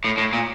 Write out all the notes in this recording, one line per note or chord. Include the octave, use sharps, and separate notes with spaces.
A2
A2
A#2